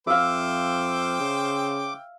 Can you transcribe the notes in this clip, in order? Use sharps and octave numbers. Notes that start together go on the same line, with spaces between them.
F2 C5 E5 F5 G5 D6
C#3